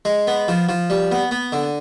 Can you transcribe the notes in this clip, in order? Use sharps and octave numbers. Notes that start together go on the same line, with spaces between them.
G#3
B3
F3
F3
G3
B3
B3
D3